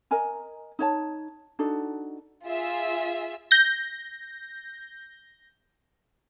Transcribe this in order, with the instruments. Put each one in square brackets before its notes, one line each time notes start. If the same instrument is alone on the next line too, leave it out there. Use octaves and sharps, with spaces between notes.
[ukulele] A#4 D#5 G#5 A#5
D#4 C#5 A5
D4 D#4 F#4 A4
[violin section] F4 G#4 E5
[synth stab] G6 A#6